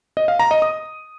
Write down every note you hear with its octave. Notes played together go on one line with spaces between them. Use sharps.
D#5
F5
A#5
D#5
D#6